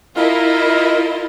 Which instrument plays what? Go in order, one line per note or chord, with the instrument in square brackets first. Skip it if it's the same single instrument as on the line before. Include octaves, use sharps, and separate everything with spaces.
[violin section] E4 A#4 D#5 [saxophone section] F4